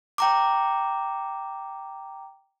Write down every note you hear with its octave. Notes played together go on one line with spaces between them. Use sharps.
G5 A#5 D6